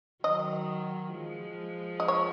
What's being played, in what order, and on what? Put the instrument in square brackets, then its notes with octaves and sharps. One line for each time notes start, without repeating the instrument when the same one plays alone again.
[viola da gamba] D#3 F#3 [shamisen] D#5
[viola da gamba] F3 G#3
[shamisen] D#5
C#5